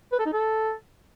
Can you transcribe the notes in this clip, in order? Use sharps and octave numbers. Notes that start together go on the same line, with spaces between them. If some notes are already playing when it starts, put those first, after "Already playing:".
B4
A4
D#4
A4